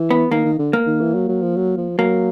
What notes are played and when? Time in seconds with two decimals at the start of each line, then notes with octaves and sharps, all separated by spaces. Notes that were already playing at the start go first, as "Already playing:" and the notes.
Already playing: E3
0.11 B3
0.31 D#3 A#3
0.45 D#3
0.59 D3
0.73 A#3
0.87 D#3
1.01 E3
1.15 F#3
1.29 F#3
1.43 F3
1.57 F#3
1.77 F3
1.98 F#3 A#3